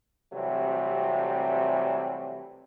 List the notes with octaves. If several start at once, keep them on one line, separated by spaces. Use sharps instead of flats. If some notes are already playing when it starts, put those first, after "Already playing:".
C3 E3 F#3 G3 A3 C4